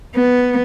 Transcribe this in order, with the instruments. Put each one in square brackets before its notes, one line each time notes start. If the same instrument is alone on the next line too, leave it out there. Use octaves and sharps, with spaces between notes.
[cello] B3